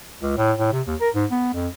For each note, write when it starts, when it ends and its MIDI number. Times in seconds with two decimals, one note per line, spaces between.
0.22 0.33 37
0.37 0.53 45
0.58 0.72 45
0.73 0.81 48
0.87 0.95 39
1.01 1.09 70
1.15 1.26 44
1.31 1.52 59
1.54 1.68 41